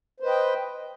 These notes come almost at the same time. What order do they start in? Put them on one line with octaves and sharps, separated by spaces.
C5 B4 D#5 G5